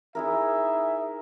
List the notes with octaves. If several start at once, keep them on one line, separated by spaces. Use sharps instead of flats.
D#4 E4 G#4 A#4 E5